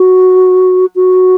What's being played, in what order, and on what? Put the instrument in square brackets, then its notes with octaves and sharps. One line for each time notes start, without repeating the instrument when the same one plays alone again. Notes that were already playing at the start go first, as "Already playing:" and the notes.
Already playing: [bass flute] F#4
F#4